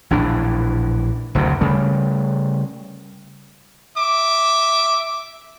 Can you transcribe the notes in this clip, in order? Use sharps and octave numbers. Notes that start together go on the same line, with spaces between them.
A#1 A2 E3 D4
F#1 D2 G2 C3
C#3 G3 A3
E5 D6